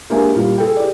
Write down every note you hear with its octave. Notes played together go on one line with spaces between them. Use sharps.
G#3 A#3 D4 G4 E5 G#5
A#2 G3 F4 G4
G#4 A4 G5
G4 G#4 D5